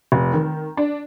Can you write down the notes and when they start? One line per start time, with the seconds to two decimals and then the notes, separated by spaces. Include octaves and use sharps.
0.12 F1
0.33 D#3
0.77 D4